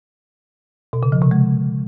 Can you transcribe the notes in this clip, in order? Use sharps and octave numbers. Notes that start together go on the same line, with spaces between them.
B2
C#3
F3
C3
G#3